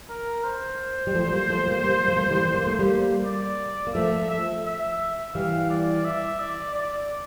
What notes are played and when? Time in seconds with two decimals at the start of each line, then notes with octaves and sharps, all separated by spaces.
0.09 A#4
0.44 C5
1.07 G3
1.15 F3 A3
1.32 G3 A#3
1.50 F3 A3
1.67 G3 A#3
1.84 G3 A#3
2.08 F3 A3
2.17 A#3
2.24 A3
2.31 E3 G3
2.54 A#3
2.67 A3
2.79 G3 A#3
3.25 D5
3.87 A#3
3.95 F3 A3 E5
4.30 E5
4.65 E5
5.34 E3 G3 F5
5.70 D5
6.05 E5
6.39 D5
6.75 D5